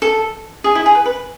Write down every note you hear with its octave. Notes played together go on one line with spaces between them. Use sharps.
A4
G#4
E4
G#4
B4
B4